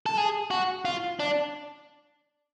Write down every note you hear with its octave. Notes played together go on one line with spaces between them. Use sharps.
A4
G#4
F#4
F4
D4